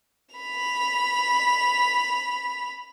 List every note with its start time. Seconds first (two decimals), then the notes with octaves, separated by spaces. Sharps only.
0.35 B5 F7